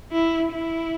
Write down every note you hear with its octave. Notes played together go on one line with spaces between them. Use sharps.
E4
E4